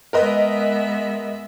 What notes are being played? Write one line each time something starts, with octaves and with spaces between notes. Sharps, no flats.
G#3 B3 A#4 B4 D#5 E5